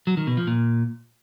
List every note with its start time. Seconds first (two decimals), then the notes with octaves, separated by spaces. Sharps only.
0.07 F#3
0.17 D#3
0.27 B2
0.37 F3
0.47 A#2